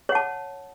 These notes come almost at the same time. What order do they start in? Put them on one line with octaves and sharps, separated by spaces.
C#5 F#5 A5